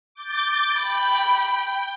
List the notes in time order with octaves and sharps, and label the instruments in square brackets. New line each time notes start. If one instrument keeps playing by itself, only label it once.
[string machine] D6 G6 A6
[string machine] G5 [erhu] B5